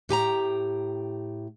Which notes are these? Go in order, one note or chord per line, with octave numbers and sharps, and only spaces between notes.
A2 G4 G#5 A#5